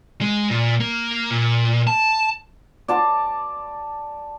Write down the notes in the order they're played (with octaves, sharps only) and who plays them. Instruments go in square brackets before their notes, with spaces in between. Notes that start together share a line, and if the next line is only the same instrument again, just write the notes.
[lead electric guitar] G#3
A#2
A#3
A#2
A5
[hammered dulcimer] D5 A5 C6